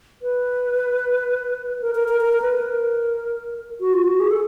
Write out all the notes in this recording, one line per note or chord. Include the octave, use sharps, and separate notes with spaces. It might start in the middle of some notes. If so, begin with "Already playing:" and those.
B4
A#4
A#4
A#4
A#4
B4
A#4
F#4
F4
F#4
G#4
A4